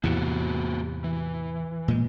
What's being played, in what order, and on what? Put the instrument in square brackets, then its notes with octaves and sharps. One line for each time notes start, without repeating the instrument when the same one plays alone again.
[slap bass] E2 A2 C3 [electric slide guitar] A#3 F#4 G4
[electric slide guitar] E3
[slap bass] A#2 G#3